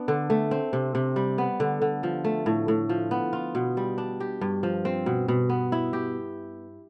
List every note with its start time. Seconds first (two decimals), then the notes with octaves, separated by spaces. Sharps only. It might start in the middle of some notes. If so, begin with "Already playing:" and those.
Already playing: B3 D4
0.08 D3
0.30 A3
0.51 C4
0.73 C3
0.95 C3
1.16 G3
1.38 B3
1.60 D3
1.82 D3
2.03 F3
2.25 A3
2.46 A2
2.68 A2
2.89 F3
3.11 B3
3.33 F4
3.55 B2
3.77 G3
3.98 D4
4.20 G4
4.41 G2
4.63 F3
4.85 C4
5.06 B2
5.28 B2
5.50 B3
5.72 E4
5.93 G4